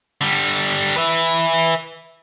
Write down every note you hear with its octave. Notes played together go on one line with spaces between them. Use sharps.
D3 G3
B4 E5